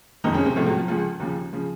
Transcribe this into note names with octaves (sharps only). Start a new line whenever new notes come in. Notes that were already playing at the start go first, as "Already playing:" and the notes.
F#1 F2 C3 D#3 D#4
C#3 C#4
C3 C4
C#2 A2 C#3 F3 A3
F#3
F3
C#2 C#3 F3
D#2 C#3 F3
C#3 F3